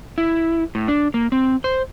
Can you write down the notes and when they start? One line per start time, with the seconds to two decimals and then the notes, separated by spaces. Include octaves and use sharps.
0.18 E4
0.75 A2
0.88 D4
1.14 A#3
1.32 C4
1.64 C5